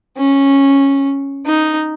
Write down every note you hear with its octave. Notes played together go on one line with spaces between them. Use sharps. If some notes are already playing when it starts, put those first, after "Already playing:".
C#4
D#4